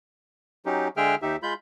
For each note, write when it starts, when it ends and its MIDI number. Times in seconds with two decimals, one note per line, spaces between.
0.66 0.88 54
0.66 0.88 61
0.66 0.88 63
0.66 0.88 67
0.97 1.15 50
0.97 1.15 56
0.97 1.15 68
0.97 1.15 76
0.97 1.15 79
0.97 1.15 89
1.22 1.36 39
1.22 1.36 63
1.22 1.36 67
1.22 1.36 76
1.43 1.54 56
1.43 1.54 65
1.43 1.54 83
1.43 1.54 91